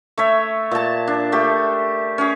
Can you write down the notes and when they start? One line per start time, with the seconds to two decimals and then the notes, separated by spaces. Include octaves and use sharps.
0.18 A3 C#5 E5
0.71 A#2 A5
1.08 D4
1.32 A3 G4
2.18 C#4 G#4